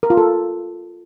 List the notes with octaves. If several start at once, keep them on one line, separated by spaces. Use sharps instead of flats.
A#4
F4
A4